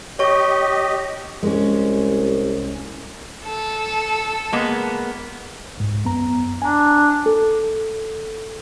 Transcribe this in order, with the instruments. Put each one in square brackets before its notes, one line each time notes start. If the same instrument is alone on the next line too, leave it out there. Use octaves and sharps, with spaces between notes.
[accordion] G4 D#5 [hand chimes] C#5 C#6
[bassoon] C2 [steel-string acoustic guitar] G#3 C#4
[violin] A4
[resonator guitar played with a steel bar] G#3 A#3 B3
[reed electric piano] C2 G#2
F#2 B3 A#5
[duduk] D4 [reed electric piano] G#5 A#5
[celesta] A4